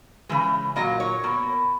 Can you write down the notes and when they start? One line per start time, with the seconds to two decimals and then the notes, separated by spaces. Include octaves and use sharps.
0.29 C#3 E3 G#3
0.76 A#2 F#3 A#3 D#5
1.00 C#5
1.23 B2 A#3